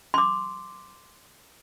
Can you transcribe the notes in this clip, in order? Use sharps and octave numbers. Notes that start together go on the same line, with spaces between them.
C6 D6